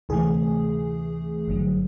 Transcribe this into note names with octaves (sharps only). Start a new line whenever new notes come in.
D2 C3 E3 A3 G#4
G#1 G2 D3 F#3